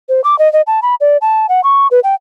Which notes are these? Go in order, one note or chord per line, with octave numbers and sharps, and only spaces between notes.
C5
D6
D#5
D#5
A5
B5
D5
A5
F#5
C#6
B4
G5